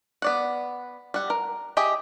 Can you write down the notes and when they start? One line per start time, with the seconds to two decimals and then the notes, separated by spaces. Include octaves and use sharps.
0.22 B3 D5 F#5
1.14 G3 F#5
1.30 A#4
1.77 G4 G#4 D#5 E5